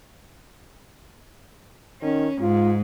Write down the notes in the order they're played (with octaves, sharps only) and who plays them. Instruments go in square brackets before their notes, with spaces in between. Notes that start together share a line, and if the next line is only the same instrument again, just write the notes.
[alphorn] D#3 [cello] C#4
[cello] G#2 [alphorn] F4